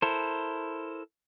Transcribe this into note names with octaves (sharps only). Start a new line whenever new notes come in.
E4 A4 A#4 C5